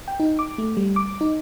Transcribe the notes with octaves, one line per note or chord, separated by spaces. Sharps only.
G5
D#4
D6
A3
G3
D6
D#4